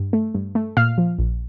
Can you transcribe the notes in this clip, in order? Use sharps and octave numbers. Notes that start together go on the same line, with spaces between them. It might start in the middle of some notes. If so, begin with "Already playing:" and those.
Already playing: G2
A3
G2
A3
A#2 F5 F6
F3
A#1